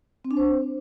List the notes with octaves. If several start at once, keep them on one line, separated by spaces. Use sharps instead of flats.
C4
D4
C5